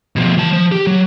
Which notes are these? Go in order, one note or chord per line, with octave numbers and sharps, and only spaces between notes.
B2 F3
E3 A5
F3
G4
F#3